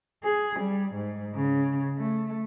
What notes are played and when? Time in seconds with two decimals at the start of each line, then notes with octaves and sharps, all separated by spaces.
0.23 G#4
0.60 G3
0.93 G#2
1.35 C#3
1.98 A3